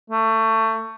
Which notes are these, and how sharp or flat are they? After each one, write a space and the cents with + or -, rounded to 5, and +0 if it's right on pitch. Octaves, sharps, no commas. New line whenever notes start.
A3 +25